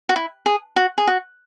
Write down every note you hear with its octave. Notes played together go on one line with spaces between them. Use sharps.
F#4
E4
G#4
F#4
G#4
F#4